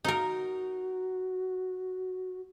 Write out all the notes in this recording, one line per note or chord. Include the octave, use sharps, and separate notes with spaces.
D#4 F#4 A#4